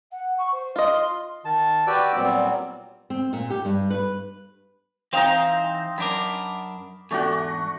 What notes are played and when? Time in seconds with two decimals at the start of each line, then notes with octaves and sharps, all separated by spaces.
0.11 F#5
0.38 C#6
0.51 C5
0.76 F4 D#5 C6
1.45 D#3 A5
1.87 F#4 G4 B4 D5 G5 E6
2.16 A#2 F#3 G3 B3 C4
3.10 C4
3.33 A#2
3.50 G4
3.65 G2
3.90 B4
5.13 E3 C4 D#4 C5 F5 A#5
5.98 F#2 D4 A#4 B5 D6
7.11 E2 G#2 A3 D4 F#4